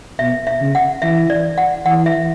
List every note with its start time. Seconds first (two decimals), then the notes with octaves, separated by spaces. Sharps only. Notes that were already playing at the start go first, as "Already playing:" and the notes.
0.19 B2 E5
0.47 E5
0.61 C#3
0.75 F#5
1.02 E3 E5
1.30 D5
1.58 F#5
1.86 E3 F#5
2.06 E5